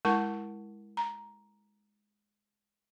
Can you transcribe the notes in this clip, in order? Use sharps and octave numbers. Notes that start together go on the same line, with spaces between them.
G#3 E4 A#4 F#5 A5 C#6
A#5